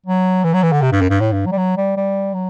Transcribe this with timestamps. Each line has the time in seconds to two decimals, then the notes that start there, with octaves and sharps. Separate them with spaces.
0.06 F#3
0.44 E3
0.54 F#3
0.63 E3
0.72 D3
0.82 C3
0.92 G2
1.01 F#2
1.10 G2
1.20 A2
1.33 G2
1.46 F#3
1.52 G3
1.57 F#3
1.77 G3
1.97 G3
2.34 F#3